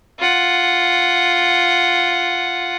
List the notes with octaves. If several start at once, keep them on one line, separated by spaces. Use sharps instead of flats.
F4 F#5